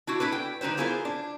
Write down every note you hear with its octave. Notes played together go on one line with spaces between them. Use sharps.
D4 E4 F#4
D4 E4 A4 B4
G5
D3 D#4 E4 B4 C5
B3 E4 F4 G#4 A#4 C5
D4